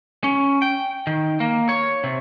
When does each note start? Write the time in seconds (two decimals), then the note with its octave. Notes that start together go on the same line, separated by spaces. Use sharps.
0.24 C#4
0.62 G5
1.07 D#3
1.40 A#3
1.69 C#5
2.04 C3